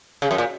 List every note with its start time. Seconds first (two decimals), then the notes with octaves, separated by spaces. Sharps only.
0.22 C#3
0.31 F#2
0.38 A#2